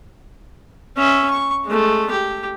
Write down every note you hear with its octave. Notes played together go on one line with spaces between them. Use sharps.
C#4 E5
C#6
G#3 A3
G4